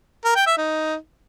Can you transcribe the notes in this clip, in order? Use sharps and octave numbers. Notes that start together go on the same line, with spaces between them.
A#4
G5
E5
D#4